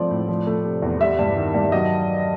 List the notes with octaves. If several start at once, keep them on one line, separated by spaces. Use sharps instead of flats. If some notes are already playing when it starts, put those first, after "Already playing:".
Already playing: G#2 F3 A3 C4 D5
A2
F3
A3
C3
E2
G3 E5
G2
D#3
G2
F#3 D#5